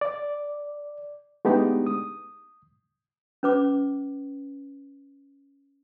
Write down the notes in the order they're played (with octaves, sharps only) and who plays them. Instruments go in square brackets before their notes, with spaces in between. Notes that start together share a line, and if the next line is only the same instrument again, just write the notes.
[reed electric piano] D5
G#3 A3 B3 D4 D#4 G4
D#6
[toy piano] C#4 B4 D6